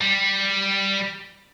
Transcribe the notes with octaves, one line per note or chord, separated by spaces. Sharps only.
G3